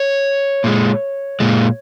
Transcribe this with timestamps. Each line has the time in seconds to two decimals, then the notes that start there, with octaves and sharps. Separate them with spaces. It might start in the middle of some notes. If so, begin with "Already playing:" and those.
Already playing: C#5
0.64 A#2 G#3
1.40 A#2 G#3